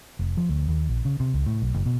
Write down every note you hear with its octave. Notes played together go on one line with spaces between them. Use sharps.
F1
F3
D2
D#2
A#1
C#3
C3
C#2
A2
B1
F#1
B2